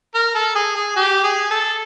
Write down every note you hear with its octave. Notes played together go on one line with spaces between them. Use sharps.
A#4
A4
G#4
G#4
G4
G#4
A4